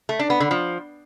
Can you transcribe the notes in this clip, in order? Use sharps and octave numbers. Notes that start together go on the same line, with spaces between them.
A3
D4
B3
D3
F3